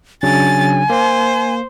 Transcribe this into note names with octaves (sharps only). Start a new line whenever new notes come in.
C#3 F#3 D4 G#5 A6
A#3 C5